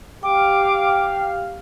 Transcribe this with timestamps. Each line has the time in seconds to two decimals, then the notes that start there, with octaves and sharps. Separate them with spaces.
0.23 G4 F5 G5 D6